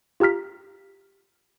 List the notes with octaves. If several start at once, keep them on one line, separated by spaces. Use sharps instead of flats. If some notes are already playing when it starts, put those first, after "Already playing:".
F4 G4 A#5 F6 B6